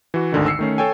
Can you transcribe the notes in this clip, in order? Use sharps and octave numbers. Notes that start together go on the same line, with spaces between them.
E3 F#4
G#1 D2 D3 D#3
E6 C7 C#7
D#3 A3 C#4
A4 C#5 G5 G#5